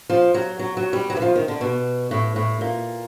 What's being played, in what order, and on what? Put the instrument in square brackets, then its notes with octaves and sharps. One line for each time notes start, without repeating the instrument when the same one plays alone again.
[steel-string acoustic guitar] F3
F#3
F#3
F#3
G3
F#3
E3
F3
D#3
D3
B2
A2
A2
A#2